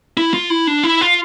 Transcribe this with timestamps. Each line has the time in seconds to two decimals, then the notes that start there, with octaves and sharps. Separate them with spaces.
0.17 E4
0.34 F4
0.50 E4
0.67 D4
0.84 E4
1.01 F4